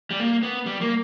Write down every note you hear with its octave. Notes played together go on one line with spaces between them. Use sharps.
G3
A#3
B3
G3
A#3